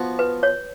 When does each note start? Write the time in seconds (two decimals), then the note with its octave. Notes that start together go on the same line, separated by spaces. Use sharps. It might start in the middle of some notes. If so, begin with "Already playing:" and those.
Already playing: F3 B3 F#4
0.19 B4
0.43 C#5